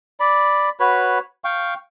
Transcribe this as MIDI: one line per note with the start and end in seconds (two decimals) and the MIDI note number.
0.20 0.69 74
0.20 0.69 83
0.80 1.19 66
0.80 1.19 71
0.80 1.19 73
0.80 1.19 83
1.44 1.74 77
1.44 1.74 79
1.44 1.74 85